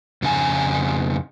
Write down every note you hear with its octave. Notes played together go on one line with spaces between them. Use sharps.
F2 C#3 D4 G#5 A#5